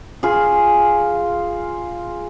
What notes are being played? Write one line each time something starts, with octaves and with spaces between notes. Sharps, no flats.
F4 G#4